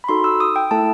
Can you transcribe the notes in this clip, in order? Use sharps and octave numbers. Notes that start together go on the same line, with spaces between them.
B5
D#4 F#4 A4 C6
E6
D#6
G5
A3 E4 A4 A5